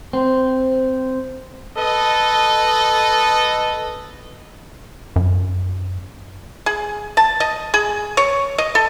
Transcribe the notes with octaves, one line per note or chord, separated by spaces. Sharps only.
C4
A4 B4 D#5
F#2
G#4
A5
D#5
G#4
C#5
D#5
A4